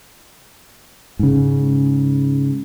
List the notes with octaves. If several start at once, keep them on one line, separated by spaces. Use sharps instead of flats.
G#2 C#3